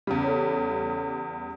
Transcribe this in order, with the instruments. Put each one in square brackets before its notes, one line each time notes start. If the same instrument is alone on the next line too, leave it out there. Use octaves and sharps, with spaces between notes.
[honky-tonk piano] E2 C#3 G3
[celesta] A4 C#5